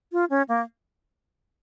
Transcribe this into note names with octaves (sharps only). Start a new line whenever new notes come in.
F4
C#4
A#3